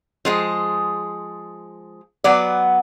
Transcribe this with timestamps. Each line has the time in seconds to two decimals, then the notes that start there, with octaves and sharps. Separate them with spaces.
0.25 F3 G#3 G#4
2.24 F#3 B3 D5